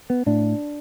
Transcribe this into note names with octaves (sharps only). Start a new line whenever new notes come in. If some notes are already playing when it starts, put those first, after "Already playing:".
B3
A2 D4